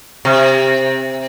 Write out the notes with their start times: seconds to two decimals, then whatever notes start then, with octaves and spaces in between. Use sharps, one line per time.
0.25 C3